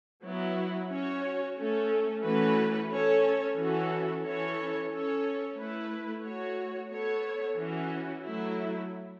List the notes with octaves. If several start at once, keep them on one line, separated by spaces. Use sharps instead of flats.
F#3 B3 E4
C#4 F#4 C#5
A3 C#4 A4
E3 A3 C#4 F#4 B4
C#4 A4 C#5
E3 C#4 F#4 A4
E3 C#4 A4 C#5
C#4 A4 C#5
A3 E4 B4
A3 F#4 C#5
B3 A4 C#5
E3 C#4 F#4
F#3 A3 E4